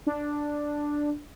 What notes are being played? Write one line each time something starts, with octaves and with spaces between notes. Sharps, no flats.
D4